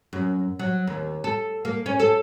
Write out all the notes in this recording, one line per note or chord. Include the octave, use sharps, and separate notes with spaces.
F#2
F#3
D#2
A4
A#3
C#4
A4